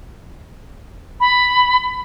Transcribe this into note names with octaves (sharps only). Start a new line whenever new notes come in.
B5